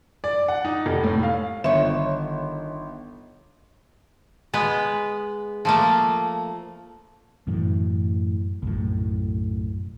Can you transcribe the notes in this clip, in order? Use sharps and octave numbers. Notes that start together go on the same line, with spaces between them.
D5
F#5
D#4
F1
A2
F5
G1 D#3 C#5 E5
G#3 B3 B4
F3 A3 A#3
F#2 A2 E3
B1 F#2 A2